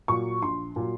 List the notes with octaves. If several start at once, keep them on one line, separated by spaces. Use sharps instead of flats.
A#2 F#3 C#6
A#1 C6
A#2 F#3